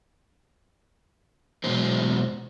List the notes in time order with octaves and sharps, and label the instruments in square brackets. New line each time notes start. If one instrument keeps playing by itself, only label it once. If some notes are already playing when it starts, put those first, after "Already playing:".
[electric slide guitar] E2 B2 F#3 G#3 C5